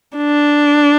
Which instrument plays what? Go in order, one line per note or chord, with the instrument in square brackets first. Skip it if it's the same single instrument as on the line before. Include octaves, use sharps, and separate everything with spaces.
[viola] D4